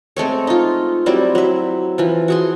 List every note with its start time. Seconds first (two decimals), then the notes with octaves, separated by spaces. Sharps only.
0.17 G#3 A3 C4 C#5
0.47 D#4 F4
1.06 F#3 G3 C4 E4
1.35 F#3 E5
1.98 E3 F3
2.28 F#4 G#4 C6